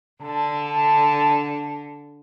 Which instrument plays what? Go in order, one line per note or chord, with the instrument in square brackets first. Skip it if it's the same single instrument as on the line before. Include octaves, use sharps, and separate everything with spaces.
[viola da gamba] D3 [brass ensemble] A5